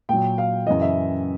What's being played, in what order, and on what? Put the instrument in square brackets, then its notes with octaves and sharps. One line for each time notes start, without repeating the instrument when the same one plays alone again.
[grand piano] A#2 F#3 G5
F5
F#2 C#3 E3 D#5
E5